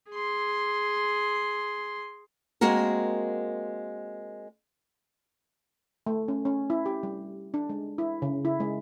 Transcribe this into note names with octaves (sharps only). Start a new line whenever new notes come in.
G#4 C6
G#3 A#3 C4 F#4 A#4
A3
C#4
C#4
E4
G4
G3
D4
G#3
E4
C#3
E4
G#3